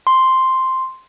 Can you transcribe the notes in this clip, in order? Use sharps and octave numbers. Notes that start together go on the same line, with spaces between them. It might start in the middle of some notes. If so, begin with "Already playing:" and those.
C6